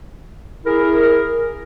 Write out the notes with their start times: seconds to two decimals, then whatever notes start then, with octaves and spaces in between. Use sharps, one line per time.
0.65 E4 G#4 A#4